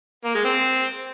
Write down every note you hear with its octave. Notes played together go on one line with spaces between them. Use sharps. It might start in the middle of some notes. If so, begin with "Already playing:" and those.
A#3
G#3
C4